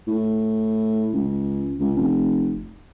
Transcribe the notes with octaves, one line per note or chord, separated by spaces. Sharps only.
A2
C#2
C#2
F1